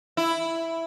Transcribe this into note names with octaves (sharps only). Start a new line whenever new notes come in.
E4